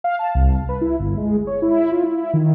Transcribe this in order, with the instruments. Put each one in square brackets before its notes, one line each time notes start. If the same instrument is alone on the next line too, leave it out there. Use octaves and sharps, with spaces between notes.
[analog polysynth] F5
A5
C2
B4
E4
G1
G#3
C#5
E4
F4
E4
D#3